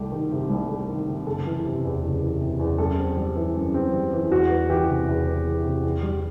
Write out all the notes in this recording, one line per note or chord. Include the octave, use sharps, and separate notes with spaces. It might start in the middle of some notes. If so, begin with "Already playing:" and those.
Already playing: C2 A3 G4
D#3
C3
C2
A3
D#3
C3
F#1 A4
E3
C3
E2
F#1
E3
C3
E2
F#2 A4
C4
G3
E3
F#2
C4
G3
E3
E2 F#4
B3
E3 G4
C3
E2
B3
E3
C3
E2
G3